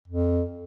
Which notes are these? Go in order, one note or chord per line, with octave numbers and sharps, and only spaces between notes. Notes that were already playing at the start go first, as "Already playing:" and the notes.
F2